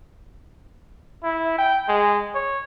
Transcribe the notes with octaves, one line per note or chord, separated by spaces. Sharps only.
E4
G5
G#3
C#5